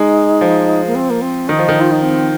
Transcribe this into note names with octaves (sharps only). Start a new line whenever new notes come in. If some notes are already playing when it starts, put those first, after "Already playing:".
Already playing: G#3 D#4
F3
A#3
C4
A#3
C4
D#3 D#4
F3
D#3
F4
D#4
C4